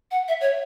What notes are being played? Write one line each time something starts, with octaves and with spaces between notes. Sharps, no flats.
F#5
E5
C#5